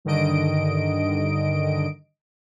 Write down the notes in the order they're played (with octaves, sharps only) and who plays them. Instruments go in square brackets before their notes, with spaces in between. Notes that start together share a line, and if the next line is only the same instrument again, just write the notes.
[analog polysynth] G2 D3 D#3 D#5 D7